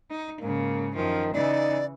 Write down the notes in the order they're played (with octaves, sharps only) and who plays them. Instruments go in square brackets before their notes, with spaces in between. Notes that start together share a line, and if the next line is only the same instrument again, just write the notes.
[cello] D#4
[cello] G#2 C#3 [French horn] A#3
[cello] F#2 F3 [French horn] D#3
[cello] C#3 E3 [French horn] D#4 [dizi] D5